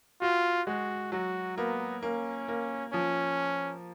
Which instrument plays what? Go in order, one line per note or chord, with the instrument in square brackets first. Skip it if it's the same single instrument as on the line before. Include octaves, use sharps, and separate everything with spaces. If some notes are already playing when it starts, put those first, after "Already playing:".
[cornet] F4 [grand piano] F#4
[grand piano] G#3 [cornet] F#4
[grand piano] F#3 [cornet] F#4
[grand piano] A#3 [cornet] B3
[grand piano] A#3 [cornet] C#4
[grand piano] A#3
[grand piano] F3 [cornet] C#4